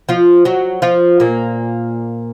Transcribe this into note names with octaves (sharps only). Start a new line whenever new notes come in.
F3 F4
F#3 F#4
F3 F4
A#2 A#3